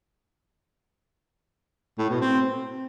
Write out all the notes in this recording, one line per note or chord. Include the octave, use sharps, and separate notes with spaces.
A2
B2
C4